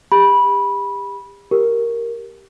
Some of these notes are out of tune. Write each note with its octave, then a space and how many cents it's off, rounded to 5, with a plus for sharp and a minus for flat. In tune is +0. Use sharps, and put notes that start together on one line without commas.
G4 +35 B5 -15
G4 +0 A#4 +0